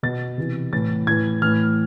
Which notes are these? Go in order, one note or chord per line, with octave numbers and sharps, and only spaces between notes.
B2 A6
C3 E3
A2 E3 A6
A2 E3 G#6
A2 E3 F6